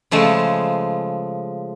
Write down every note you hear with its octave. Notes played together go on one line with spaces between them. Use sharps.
C#3 F3 G#3 A3